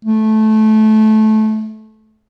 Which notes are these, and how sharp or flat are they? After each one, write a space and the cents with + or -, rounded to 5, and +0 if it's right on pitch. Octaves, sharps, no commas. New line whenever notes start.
A3 -20